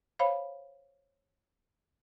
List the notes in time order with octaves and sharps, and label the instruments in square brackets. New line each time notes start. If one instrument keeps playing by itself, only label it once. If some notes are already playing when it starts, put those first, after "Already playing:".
[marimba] C5 C#5 F5 B5